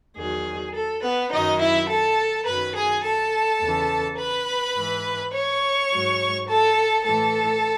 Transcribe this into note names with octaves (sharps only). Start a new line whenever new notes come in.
E2 D#3 F#3 G#4
A4
B3 B4
F#2 D#3 F#3 D#4 D#5
E4 E5
A4 A5
F#2 D#3 F#3 B4 B5
G#4 G#5
A4 A5
E2 C#3 E3
B4 B5
G#2 E3
C#5 C#6
G#2 F#3
A4 A5
A2 E3 A4 A5